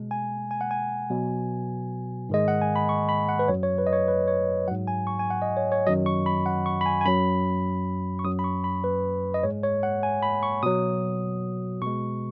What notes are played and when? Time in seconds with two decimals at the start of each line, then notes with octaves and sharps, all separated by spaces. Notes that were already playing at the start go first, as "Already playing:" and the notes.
Already playing: B2 G#3
0.11 G#5
0.51 G#5
0.61 F#5
0.71 G#5
1.10 B2 F#3
2.29 G#2 D#3 G#3 D#5
2.48 F#5
2.62 G#5
2.76 B5
2.89 C#6
3.09 B5
3.29 F#5
3.39 B4
3.48 F#2 F#3 C#5
3.63 C#5
3.78 B4
3.87 D#5
3.93 C#5
4.08 B4
4.28 C#5
4.68 G#2 F#3 F#5
4.87 G#5
5.07 C#6
5.19 G#5
5.30 F#5
5.42 D#5
5.57 C#5
5.72 C#5
5.86 F#2 D#3 F#3 D#5
6.06 C#6
6.26 B5
6.46 F#5
6.66 C#6
6.81 B5
6.86 G#5
7.01 G#5
7.05 F#2 F#3 B5
8.19 C#6
8.24 F#2 F#3 D#6
8.39 B5
8.44 C#6
8.64 B5
8.84 B4
9.34 D#5
9.43 G#2 G#3 C#5
9.63 C#5
9.83 F#5
10.03 G#5
10.23 B5
10.43 C#6
10.63 B2 F#3 D#6
11.82 B2 G#3 C#6